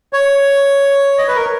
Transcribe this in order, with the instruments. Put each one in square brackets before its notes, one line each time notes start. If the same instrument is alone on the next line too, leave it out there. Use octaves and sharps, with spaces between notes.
[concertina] C#5
D#5
B4
A#4